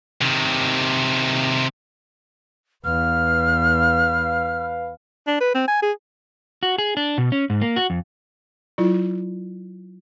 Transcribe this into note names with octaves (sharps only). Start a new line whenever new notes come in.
C3 D#3
E2 B4 F5 F6
D4
B4
C4
G#5
G#4
F#4
G#4
D4
B2
C#4
G#2
A#3
F#4
F2
F#3 E4 F4